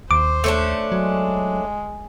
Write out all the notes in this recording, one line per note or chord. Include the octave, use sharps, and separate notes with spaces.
D#2 C5 D6
A3 C#4 D4
F#3 G#3